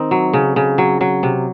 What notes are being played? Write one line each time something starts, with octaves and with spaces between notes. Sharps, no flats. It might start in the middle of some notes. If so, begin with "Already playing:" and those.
Already playing: D#3 C4 D#4
F#3
C#3
C#3
F#3
F#3
C3